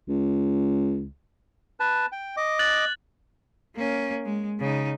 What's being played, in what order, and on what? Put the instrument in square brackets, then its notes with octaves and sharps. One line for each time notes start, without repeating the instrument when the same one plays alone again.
[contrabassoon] C#2
[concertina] B4 A5
G5
D#5 D6
[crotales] F#6 A6 F#7
[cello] A#3 C#4
G#3
C#3 D#4